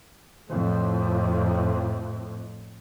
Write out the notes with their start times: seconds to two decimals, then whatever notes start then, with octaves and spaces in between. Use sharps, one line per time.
0.48 F2 A2